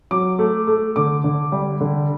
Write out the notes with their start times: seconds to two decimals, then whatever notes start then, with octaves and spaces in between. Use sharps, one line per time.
0.11 F#3 D6
0.39 A3
0.67 A3
0.96 D3 D6
1.24 D3
1.52 G3
1.81 D3